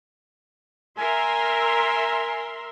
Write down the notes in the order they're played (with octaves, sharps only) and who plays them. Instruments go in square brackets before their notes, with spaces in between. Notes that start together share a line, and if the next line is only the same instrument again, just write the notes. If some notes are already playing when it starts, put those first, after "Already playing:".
[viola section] A#4 E5 C6 [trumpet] G#5